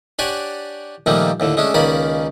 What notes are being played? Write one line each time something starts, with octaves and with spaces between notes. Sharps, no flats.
D4 G4 C#5 D5 F#5 G#5
A#2 D#3 F3 G3 A3 A#3
D#2 A2 D3
G#3 A3 C#4 D4
C#2 D#3 A#3 C#4 D5 B5